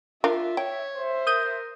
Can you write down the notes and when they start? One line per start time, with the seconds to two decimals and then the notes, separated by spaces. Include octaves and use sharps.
0.24 D4 F4 A#4 E5 F5
0.57 C#5 G5
0.97 C5 E5
1.27 A#4 D#6 G6 D#7